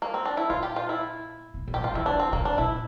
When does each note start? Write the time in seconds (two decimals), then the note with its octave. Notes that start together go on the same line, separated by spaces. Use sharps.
0.02 A#3
0.14 C4
0.25 D4
0.37 E4
0.50 A#2 F4
0.63 G4
0.76 F4
0.89 E4
1.54 C3
1.67 A#2
1.74 G4
1.81 D3 F4
1.93 E3 E4
2.06 D3 D4
2.20 C4
2.33 C3 A#3
2.45 D4
2.58 A#2 E4